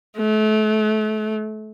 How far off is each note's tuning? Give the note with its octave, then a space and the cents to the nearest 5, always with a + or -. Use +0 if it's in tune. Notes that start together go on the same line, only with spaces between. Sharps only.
A3 -30